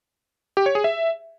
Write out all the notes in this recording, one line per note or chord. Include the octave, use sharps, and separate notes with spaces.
G4
C#5
G#4
E5